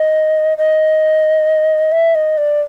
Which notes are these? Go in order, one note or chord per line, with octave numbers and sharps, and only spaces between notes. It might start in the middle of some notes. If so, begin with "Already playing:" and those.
Already playing: D#5
D#5
E5
D#5
D5